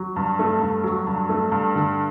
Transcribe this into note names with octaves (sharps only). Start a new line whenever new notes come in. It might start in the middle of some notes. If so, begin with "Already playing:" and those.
Already playing: F#3
G2
A3
G2
F#3
G2
A3
G2
D3